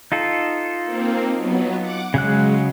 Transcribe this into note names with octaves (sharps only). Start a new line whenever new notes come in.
D#4 F4 A4
A#3 C4
F#3 B3
F#5 D6
C#3 F#3 G#3 F#6